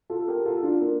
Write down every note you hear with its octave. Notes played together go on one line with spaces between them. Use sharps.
F4 A4
G4 A#4
F4 A4
D4 F4
A#3 D4